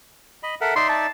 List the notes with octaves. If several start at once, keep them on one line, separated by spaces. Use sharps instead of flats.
D#5 B5
A4 A#4 E5 F#5
D#4 D5 E5 C6
A5